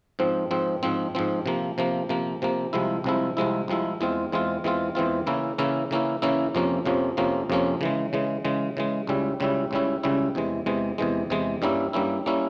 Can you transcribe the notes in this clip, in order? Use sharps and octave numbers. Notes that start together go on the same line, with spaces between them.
G#2 F3 C4
G#2 F3 C4
G#2 F3 C4
G#2 F3 C4
C3 F3 A#3
C3 F3 A#3
C3 F3 A#3
C3 F3 A#3
C2 C3 F3 G#3 E4
C2 C3 F3 G#3 E4
C2 C3 F3 G#3 E4
C2 C3 F3 G#3 E4
E2 E3 G#3 C4 F4
E2 E3 G#3 C4 F4
E2 E3 G#3 C4 F4
E2 E3 G#3 C4 F4
C#3 E3 A#3 C#4 E4
C#3 E3 A#3 C#4 E4
C#3 E3 A#3 C#4 E4
C#3 E3 A#3 C#4 E4
F2 C3 F3 A#3 C#4
F2 C3 F3 A#3 C#4
F2 C3 F3 A#3 C#4
F2 C3 F3 A#3 C#4
C#3 E3 G#3
C#3 E3 G#3
C#3 E3 G#3
C#3 E3 G#3
C#2 C#3 G3 C#4 E4
C#2 C#3 G3 C#4 E4
C#2 C#3 G3 C#4 E4
C#2 C#3 G3 C#4 E4
E2 C3 E3 G#3
E2 C3 E3 G#3
E2 C3 E3 G#3
E2 C3 E3 G#3
G2 G3 A#3 C#4 E4
G2 G3 A#3 C#4 E4
G3 A#3 C#4 E4